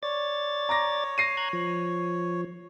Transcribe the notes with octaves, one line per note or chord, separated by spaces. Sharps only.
C#5 D5 A6
A#5 D6 A#6
A#6 C7 D#7
A#5 F#6 G#6
F3